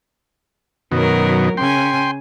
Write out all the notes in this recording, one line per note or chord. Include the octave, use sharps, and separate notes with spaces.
F#2 B2 D#3 F#3 A#4
C#3 G5 G#5 C6